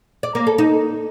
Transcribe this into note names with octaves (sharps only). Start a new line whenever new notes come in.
D5
A#3
A4
D#4